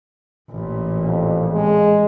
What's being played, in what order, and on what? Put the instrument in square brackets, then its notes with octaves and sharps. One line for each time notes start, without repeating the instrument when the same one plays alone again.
[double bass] A1 A#2
[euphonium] F2
G#3